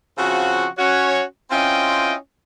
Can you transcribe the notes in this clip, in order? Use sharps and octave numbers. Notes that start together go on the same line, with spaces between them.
C#3 F3 C4 F#4
C#4 F#4 C#5
C4 C#4 E4 F4 D#5 G5